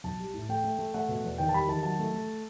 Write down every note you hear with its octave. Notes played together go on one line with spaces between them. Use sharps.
B1 A5
G3
A2
A3 G5
A3
A3
A3 F#5
B2
E2
D#3 G5
A5
G3 B5
D#3 A5
F#3 A5
A3
A3